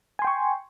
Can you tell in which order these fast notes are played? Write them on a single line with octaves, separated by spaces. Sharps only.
G#5 C6 G5 C#6